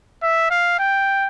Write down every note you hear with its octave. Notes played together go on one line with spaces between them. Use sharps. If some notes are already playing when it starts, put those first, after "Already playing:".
E5
F5
G5